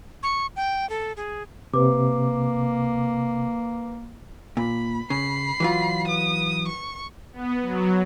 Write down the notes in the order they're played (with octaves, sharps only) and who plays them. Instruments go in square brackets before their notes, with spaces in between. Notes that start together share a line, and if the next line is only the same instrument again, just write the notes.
[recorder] C#6
G5
A4
G#4
[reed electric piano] C3 [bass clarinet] A#3 [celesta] B4 D6
[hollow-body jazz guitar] A#2 [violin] B5
[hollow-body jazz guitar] C#3 [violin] B5 C7
[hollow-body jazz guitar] E3 F#3 F4
[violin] B4 D#6
C#6
[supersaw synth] B3
F#3